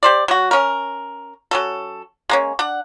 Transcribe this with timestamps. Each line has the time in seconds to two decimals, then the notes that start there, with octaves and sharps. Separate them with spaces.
0.03 G4 C5 D5
0.28 F#3 F#4
0.51 C#4 A#4
1.51 F#3 C#4 A4
2.29 G#3 A#3 C#4
2.59 D4 F#5